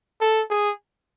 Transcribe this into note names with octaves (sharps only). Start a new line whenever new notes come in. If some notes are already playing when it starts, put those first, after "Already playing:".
A4
G#4